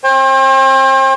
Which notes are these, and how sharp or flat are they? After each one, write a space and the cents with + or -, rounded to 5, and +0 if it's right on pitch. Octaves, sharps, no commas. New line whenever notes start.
C5 +40 G5 +30